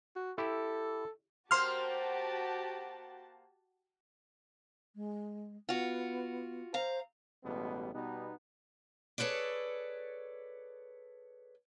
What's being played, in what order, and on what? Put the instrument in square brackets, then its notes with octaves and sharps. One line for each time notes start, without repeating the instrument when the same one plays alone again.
[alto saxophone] F#4
[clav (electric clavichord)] E4 G4 [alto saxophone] A4
[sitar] A#3 C5 [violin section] F#4 G4 A5 [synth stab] C6 F6
[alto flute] G#3
[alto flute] B3 [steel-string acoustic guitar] F4 F#4
[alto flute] C5 [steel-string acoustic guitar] F5 A#5
[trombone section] A1 B2 G3 G#3 B3
B2 G3 B3 D#4
[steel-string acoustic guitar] G#4 A4 B4 C#5 D5